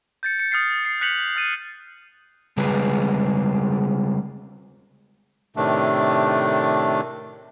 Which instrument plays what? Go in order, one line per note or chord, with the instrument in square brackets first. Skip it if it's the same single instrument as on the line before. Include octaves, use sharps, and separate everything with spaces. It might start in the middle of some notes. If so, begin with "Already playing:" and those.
[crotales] G6 A6 C#7
C#7
D#6 F6 A6 C7 C#7
C7 C#7
F#6 G6 B6 C#7 F7 F#7
F6 A6 D#7
[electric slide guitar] C#3 G3 G#3 G#4 B4
[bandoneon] A2 C3 D#3 A3 D4